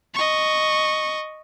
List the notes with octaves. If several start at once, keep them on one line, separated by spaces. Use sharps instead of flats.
D#5 C#6